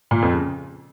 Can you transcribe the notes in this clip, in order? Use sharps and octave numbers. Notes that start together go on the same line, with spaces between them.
A#2
F2
C#3